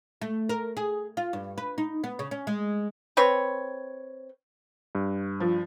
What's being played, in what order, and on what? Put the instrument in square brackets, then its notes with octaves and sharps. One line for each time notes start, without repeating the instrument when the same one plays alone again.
[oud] A3
A#4
G#4
F4
G2
B4
D#4
B3
C#3
C#4
G#3
[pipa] C4 B4 C#5
[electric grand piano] G2
[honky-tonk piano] F3